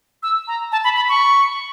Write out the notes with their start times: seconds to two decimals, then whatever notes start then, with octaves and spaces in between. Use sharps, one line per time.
0.23 E6
0.48 A#5
0.72 A5
0.84 B5
0.96 B5
1.09 C#6